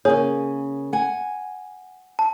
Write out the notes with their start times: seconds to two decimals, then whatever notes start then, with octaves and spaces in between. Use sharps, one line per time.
0.05 C#3 A#3 G#4 C#5
0.93 F#5 G#5
2.19 A5